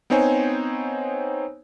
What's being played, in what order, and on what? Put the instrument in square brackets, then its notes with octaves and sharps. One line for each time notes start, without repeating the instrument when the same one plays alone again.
[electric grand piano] B3 C4 D#4 C5 C#5 G#5